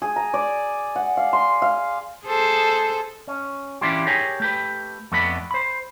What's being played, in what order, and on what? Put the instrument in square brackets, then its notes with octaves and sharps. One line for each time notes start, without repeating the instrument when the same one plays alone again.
[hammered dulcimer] G#4
A#5
D5
F#5
F5
C6
F5
[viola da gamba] G#4 A4 C5
[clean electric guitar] C#4
E3 C#4 D4 E4 F4 G4
G4 G#4 A#4 C#5 G#5
A3 G4 B4
F2 A3 B3 D4 B5
C5 B5